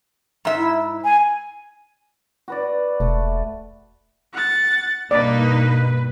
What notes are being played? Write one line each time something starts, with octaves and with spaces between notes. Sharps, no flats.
G#2 E5
E4
G#5
F#4 B4 D5
E1 A3
F#5 A6
G2 B2 A#3 D#4 B4 D5